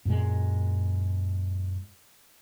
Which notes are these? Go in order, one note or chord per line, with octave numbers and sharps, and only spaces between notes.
F#2 A#2 G#3